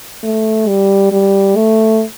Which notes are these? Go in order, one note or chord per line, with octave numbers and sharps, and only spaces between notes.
A3
G3
G3
A3